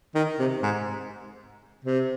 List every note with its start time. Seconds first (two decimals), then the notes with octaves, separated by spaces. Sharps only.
0.15 D#3
0.39 C3
0.63 G#2
1.85 C3